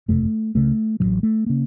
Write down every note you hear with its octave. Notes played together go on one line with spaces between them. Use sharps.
F#1 F2 C3 A3
C#2 C#3 A3
A1 A2 F#3
A3
C#3 A#3